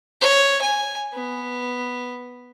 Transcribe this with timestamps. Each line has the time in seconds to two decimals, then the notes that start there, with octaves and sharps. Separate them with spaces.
0.21 C#5
0.62 G#5
1.13 B3